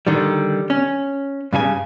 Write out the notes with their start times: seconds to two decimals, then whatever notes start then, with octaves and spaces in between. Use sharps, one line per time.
0.07 D3 D#3 G3
0.70 C#4
1.53 G2 C#3 G#4 G#5